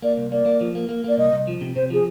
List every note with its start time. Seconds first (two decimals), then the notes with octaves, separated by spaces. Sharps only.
0.02 A#3 D5
0.17 C2
0.32 A#3 D5
0.46 A#3
0.61 F3
0.75 A#3
0.89 A#3
1.04 A#3 D5
1.18 C2 D#5
1.32 C2
1.47 F3
1.61 C3
1.76 C3 C5
1.90 F3 G#4